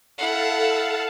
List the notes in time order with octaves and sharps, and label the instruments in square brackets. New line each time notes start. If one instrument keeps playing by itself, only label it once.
[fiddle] E4 F#5 [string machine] A4 F5 A5